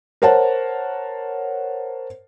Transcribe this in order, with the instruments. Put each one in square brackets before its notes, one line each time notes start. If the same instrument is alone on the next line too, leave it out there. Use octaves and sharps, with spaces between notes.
[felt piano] A#4 C5 C#5 F#5 A5